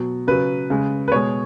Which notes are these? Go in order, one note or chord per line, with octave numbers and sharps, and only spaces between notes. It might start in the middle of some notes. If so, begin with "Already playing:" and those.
Already playing: B2 F#3
C#3 F#3 B4
C#3 G#3
B4
B2 G#3 C#5